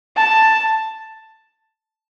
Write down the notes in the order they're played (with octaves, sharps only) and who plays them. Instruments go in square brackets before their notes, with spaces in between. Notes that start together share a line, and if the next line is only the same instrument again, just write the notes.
[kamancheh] A5